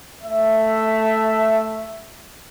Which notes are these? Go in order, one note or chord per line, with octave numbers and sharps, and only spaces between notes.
A3 E5